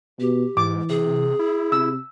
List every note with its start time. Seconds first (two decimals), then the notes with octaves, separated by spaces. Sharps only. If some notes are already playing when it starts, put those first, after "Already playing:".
0.20 B2 G4
0.57 G#2 E3 D6
0.89 C3 G#4
1.39 E4
1.72 C3 E6